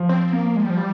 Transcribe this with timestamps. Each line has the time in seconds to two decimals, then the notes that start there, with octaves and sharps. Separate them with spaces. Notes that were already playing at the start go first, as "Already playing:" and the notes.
Already playing: F3
0.09 C4
0.33 A#3
0.56 G#3
0.63 G3
0.70 F3
0.77 G3